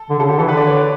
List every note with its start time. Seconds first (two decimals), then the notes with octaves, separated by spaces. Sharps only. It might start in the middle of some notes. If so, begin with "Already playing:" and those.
Already playing: A4
0.10 D3
0.19 C#3 A4
0.28 D3 G4
0.39 E3 A4
0.48 D3 B4
0.57 D5
0.67 C#5
0.77 B4